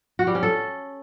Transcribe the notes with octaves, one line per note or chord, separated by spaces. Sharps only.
F#4
G3
C#4
A4